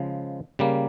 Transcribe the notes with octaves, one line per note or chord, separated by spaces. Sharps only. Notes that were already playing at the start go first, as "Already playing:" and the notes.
Already playing: C#3 F3 G#3
C#3 G3 A#3